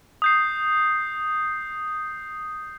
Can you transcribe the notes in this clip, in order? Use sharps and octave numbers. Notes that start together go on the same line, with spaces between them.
D#6 G6 C7